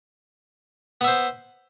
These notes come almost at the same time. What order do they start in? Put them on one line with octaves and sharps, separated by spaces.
B3 E5 C5